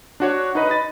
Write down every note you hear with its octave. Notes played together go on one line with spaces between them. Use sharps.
D4 F#4 C#5
D#4 B4 D#5
D#5 B5 A6